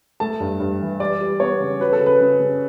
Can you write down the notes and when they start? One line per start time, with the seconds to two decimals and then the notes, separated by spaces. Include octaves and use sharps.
0.20 A3 A5
0.40 G2
0.60 G2
0.81 E3
1.00 G3 D5
1.21 G3
1.40 B3 C#5
1.60 C#3
1.80 F#3 B4
1.93 A4
2.00 C#3
2.06 B4
2.20 C#3
2.40 C#3